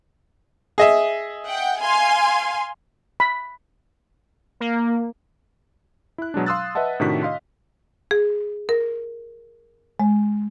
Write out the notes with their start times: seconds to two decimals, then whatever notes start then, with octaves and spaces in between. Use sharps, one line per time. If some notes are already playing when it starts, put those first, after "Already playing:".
0.78 G#4 D#5 E5
1.47 F#5 G5
1.81 F5 G#5 C6
3.20 B5
4.60 A#3
6.18 E4 F#6
6.34 B2 F#3 G#3 D4
6.46 F5 C6 D#6 E6 F#6 A6
6.75 B4 D#5 E5 F#5 A5
7.00 A2 C3 D#3 D4 F#4 B6
7.23 D#5 F5 C6
8.11 G#4
8.69 A#4
10.00 G#3